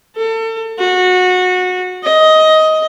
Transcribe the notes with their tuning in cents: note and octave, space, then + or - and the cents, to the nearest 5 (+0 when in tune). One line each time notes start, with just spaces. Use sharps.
A4 +35
F#4 -20
D#5 +15